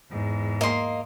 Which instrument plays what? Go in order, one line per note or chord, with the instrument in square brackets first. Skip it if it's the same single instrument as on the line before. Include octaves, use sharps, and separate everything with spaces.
[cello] E2 G#2
[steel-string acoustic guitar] A#3 [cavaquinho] D#5 C6